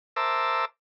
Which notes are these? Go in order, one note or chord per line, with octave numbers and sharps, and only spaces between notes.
A#4 C5 E5 A5 D6 E6